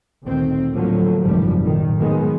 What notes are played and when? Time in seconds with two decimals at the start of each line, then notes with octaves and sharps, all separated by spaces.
0.24 D2 A#2 D#3 C4
0.74 A2 D3 F3 F#3 A3 A#3
1.23 G#1 C#2 F#2 A#2 F3 G3
1.62 B1 A2 D#3
1.99 D#3 F#3 G#3 B3